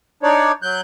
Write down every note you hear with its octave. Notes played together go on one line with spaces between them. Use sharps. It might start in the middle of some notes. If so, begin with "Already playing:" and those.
D4 D#4 C#5 D5
F#3 F#6 G6